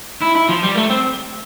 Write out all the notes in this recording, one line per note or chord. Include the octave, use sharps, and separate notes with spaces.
E4
E4
F3
G3
A3
C4